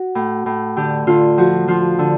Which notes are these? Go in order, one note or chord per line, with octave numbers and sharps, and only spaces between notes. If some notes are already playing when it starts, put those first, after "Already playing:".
Already playing: F#4
A2
A2
D3 G4
D3 F4
F3 F#4
F3 F4
D3